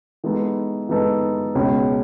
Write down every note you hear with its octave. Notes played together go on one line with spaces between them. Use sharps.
E3 G#3 B3 D#4 A4
E3 G#3 B3 D#4 A4
C#2 B2 G#3 C#4